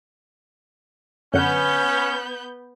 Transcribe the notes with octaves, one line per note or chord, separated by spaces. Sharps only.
F#2 D3 B3 C#4 F#5 G6